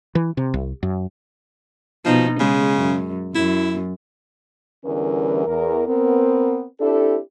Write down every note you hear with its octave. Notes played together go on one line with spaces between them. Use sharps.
E3
C3
C2
F#2
B2 F3 D#4
C#3 G#3
F#2
F#2 E4
E2 D3 E3 G3 C#4 A#4
E2 A#4
B3 C4 A#4
C4 D4 E4 G4 A4